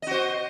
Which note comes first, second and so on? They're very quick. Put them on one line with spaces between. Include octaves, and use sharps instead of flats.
D#5 F#4 C5